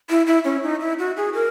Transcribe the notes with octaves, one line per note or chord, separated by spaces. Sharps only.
E4
E4
C#4
D#4
E4
F#4
G#4
A#4